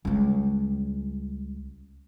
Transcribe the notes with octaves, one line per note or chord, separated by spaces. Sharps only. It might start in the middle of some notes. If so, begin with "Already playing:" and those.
C#2 G3